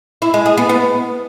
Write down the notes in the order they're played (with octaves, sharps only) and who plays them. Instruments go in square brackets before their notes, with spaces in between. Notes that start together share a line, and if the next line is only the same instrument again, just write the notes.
[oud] E4
G#3
G#4
B3
B3